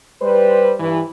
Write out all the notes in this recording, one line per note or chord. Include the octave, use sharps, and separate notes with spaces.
G3 B4 C5
G2 E3